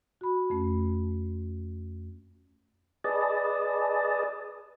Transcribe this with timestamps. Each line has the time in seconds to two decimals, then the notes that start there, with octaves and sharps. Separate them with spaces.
0.21 F#4 B5
0.50 F2 A3 C#4
3.04 G#4 B4 D5 D#5 A5